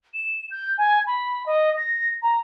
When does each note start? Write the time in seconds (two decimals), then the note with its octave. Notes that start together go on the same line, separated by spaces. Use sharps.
0.14 E7
0.51 G6
0.78 G#5
1.07 B5
1.46 D#5
1.77 A#6
2.22 A#5